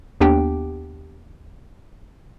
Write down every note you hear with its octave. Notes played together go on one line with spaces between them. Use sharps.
D#2 B3 D4 G4 G5